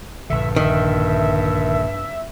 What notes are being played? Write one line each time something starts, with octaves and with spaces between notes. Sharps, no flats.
A#1 G2 D3 E5
D#3 E5